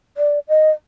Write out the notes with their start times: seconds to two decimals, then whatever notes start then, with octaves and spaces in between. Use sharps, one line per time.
0.17 D5
0.48 D#5